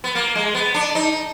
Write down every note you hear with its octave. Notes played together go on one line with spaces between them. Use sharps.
B3
A#3
G#3
B3
D4
D#4